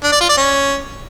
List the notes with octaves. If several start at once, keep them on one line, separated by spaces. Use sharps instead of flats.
D4
D5
F4
D5
C#4